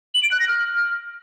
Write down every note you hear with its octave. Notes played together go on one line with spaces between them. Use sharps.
F#7
D7
F#6
A#6
F6